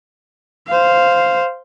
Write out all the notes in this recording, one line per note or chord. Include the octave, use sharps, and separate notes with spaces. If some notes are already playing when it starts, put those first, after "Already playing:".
C5 F5